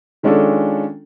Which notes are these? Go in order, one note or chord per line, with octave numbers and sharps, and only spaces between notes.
D#3 G#3 C#4 D4 F4 A4